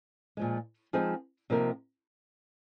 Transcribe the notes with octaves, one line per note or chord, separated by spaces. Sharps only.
A#2 F3 G#3
F3 G#3 C4 D#4 G#4
C3 F3 A#3 D#4 A#4